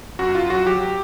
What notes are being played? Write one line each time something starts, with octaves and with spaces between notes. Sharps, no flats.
F#2 F#4
F#2 F4
F#3 F#4
F#3 G4